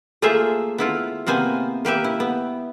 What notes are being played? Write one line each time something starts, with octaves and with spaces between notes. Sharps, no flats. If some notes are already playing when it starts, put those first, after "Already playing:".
A3 A#3 F4 G#4 C5 E5
B3 E4 F4
C3 A#3 B3 C5 G#5
A#3 G4 B4 E5
E4
B3